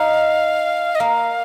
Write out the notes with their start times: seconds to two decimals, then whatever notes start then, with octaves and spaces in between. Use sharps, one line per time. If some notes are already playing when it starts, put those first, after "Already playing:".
Already playing: D#4 F5
0.95 D#5
1.00 A#3 F5